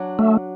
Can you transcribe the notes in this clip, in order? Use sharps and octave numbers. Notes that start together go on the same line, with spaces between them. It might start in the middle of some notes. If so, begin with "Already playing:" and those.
Already playing: F#3 D4
A3